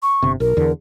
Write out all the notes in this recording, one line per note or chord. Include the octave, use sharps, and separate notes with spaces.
C#6
G1 C3
B1 A#4
E2 D3